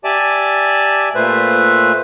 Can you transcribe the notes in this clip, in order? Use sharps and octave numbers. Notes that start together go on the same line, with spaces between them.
G4 D5 E5 G#5 A5 D6
A#2 A3 B4 C5 E5